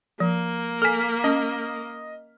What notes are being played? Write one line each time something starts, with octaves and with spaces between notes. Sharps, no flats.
F3 A#3
A4 G#5 F6 B6
C#4 D#5